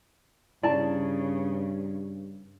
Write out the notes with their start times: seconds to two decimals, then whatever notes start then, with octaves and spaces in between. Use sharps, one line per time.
0.63 G2 C#3 E4 D5 A5